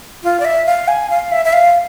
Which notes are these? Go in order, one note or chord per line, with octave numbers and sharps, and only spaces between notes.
F4
D5
E5
F5
G#5
F5
E5
E5
F5